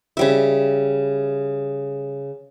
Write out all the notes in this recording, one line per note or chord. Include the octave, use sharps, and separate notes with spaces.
C#3 G3 E5